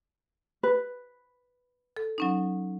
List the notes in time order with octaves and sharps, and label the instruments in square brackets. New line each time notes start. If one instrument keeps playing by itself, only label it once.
[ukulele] B4
[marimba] A4
F#3 C#4 D#4